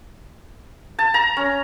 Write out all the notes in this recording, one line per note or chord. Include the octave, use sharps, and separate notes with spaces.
A5
A#5
C#4